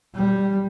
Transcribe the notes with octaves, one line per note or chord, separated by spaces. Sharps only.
G3